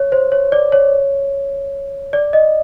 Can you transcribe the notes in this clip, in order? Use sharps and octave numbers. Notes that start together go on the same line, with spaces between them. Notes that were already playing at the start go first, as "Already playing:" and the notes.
Already playing: C#5
C5
C#5
D5
C#5
D5
D#5